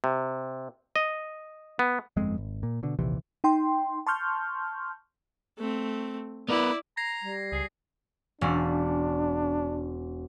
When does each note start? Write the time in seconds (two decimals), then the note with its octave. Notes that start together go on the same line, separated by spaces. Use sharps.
0.04 C3
0.96 D#5
1.79 B3
2.16 G1 F2 G#3 C4
2.38 G#1
2.63 A#2
2.83 B2 D3
2.99 A#1 D#2 C3 E3
3.44 D#4 G5 C6
4.07 A5 C6 C#6 F6 G6
5.58 A3 C4
6.49 B3 E4 A#4 B4 D5
6.97 A#5 G#6 A#6 C7
7.22 G3
7.52 C#2 G#4
8.41 E1 C#4 D4 D5